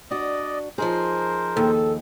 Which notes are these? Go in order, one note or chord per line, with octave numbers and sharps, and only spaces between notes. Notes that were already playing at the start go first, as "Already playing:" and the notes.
D4 F#4 D5 D#5
F3 D#4 G#4 A#4 C5
D#2 A4